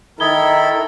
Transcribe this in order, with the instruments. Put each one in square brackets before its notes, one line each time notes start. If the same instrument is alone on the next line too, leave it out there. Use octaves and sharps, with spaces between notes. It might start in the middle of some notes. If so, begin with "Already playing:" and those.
[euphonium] D#3 [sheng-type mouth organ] E4 A4 B5 [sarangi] A#4 [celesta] D#6 G#6 G7